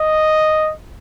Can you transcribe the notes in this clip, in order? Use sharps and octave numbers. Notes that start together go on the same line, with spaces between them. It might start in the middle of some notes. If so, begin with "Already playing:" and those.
Already playing: D#5